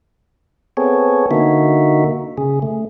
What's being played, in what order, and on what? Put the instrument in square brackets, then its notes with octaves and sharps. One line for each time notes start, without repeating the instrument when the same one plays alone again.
[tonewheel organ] B3 C4 G#4 A4 C#5
D3 A#3 D#4 F#4 E5
C#3 G#4
A3